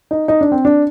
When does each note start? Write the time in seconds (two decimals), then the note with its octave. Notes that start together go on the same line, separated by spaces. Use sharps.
0.11 D#4
0.28 D#4
0.41 D4
0.52 C4
0.65 D4